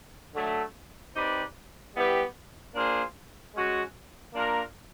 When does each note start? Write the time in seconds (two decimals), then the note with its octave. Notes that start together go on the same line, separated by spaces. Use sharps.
0.35 D3 F#3 A3
1.16 C4 D#4 G4 B4 D5
1.95 G3 B3 E4 G4 B4
2.75 A#3 D4 F4 G#4 C5
3.55 G#3 C#4 F#4
4.34 A#3 D4 F4 A#4